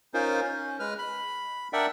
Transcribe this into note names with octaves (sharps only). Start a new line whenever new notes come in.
C#4 D#4 F4 A#4 C5
C#4
G#3 B4 F6
B5
D4 A#4 D5 E5 F#5 G5